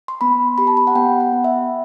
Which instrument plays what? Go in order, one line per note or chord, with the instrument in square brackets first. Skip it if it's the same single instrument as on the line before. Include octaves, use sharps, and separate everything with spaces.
[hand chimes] C6
B3 B5
G4 B5
A5
B5
F#5
B3 G5
F#5
B3
E5